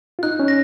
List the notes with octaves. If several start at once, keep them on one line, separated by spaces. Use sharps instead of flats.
F4
D#4 F#6
C#4
A#6